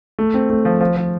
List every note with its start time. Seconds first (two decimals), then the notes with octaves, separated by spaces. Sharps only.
0.19 A3
0.34 C4
0.50 A3
0.65 F3
0.81 F3
0.97 F3